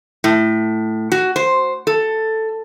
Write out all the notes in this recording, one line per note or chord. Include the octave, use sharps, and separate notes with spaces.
A2
F#4
C5
A4